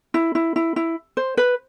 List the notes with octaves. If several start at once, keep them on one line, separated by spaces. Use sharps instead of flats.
E4
E4
E4
E4
C5
B4